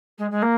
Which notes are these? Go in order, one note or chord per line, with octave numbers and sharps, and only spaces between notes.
G#3
G#3
A#3